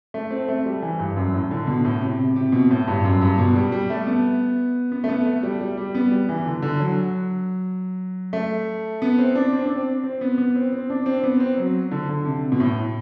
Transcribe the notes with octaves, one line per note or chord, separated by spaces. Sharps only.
A3
C4
A3
G3
E3
G2
F#2
A2
D3
B2
A2
C3
C3
C3
B2
A2
G2
F#2
G2
B2
G3
G3
A3
B3
B3
A3
B3
A3
G3
G3
G3
B3
G3
E3
D3
D3
F#3
A3
B3
C4
D4
C4
D4
C4
C4
B3
B3
C4
C4
D4
C4
B3
C4
F#3
D3
D3
C3
B2
A2